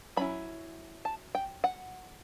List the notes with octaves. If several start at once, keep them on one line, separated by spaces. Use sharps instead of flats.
F#3 C#4 E4 B5
A5
G5
F#5